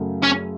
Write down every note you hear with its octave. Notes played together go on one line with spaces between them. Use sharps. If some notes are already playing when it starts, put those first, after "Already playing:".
Already playing: F#2 C#3 F#3 A3
C#4